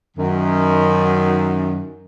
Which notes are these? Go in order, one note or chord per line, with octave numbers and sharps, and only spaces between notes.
F#2 D#3